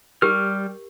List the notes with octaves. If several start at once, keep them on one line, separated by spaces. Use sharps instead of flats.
G3 G4 A#4 F6